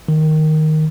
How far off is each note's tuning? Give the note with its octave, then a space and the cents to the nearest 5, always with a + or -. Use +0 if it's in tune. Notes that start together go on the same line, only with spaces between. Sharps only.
D#3 +0